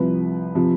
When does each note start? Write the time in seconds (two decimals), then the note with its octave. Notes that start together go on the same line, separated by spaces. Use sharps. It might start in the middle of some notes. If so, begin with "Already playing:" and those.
Already playing: C2 C3 F3 B4
0.55 C3 F3